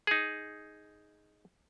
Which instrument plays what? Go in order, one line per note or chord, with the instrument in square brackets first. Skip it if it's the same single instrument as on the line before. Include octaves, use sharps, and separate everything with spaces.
[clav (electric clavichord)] D#4 G#4